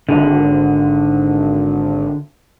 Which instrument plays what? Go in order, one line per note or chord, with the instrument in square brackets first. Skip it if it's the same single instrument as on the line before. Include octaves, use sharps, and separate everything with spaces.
[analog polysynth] G#1 [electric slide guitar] D3